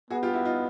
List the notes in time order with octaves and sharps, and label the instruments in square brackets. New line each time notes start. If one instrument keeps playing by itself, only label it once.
[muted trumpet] B3 [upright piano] F#4 G#4
[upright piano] F4 G4
E4 F#4
D#4 F4